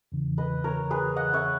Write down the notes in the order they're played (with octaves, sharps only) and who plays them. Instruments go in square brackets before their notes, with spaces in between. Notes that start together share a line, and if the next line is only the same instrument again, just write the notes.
[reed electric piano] E2 C#3 E3
[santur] B4 D#5
A#4 C#5
G#4 B4
D#5 F#5
C#5 E5